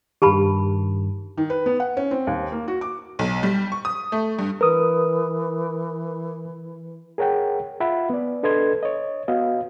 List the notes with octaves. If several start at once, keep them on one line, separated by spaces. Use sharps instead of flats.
G2 D#3 G4 A5 B5
D#3
B4
B3
F#5
C#4
C4
D#2
A#3
F#4
D6
B1
G3
C#6
D#6
A3
G2
E3 A#4 B4 D#6
G#4 A#4 C#5 F#5 G5
F4 E5 F#5 B5
B3 D5
D4 A4 B4 D#5 C6 G#6
C#5 D#5
B3 F#4 D#5 F5